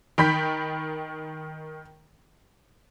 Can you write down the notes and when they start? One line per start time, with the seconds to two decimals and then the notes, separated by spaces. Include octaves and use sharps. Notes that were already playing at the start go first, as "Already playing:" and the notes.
0.18 D#3 G5 B5 G6 B6